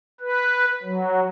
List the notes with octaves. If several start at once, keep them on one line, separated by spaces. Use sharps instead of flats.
B4
F#3